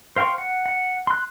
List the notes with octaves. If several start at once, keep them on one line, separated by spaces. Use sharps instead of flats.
C5 F5 G5 C6 C#6
F#5
F#5
C6 F#6